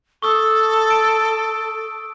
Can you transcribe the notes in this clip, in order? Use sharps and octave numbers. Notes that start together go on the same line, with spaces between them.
A4 C#6 D#6 E6
D7